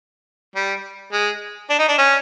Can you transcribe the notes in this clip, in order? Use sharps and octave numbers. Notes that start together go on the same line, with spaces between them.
G3
G#3
D4
D#4
D4
C#4